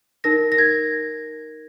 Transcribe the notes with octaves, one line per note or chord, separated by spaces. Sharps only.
D#4 A#4 A#6
A#6
G#6